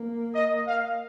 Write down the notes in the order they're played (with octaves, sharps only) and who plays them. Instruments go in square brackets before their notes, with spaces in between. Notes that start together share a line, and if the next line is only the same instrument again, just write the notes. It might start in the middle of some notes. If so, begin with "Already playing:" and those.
Already playing: [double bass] A#3
[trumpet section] D#5
F5